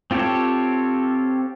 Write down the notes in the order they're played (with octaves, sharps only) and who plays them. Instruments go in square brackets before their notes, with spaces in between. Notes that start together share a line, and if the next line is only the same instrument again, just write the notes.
[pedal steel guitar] C4 F4 G4 A4 C#5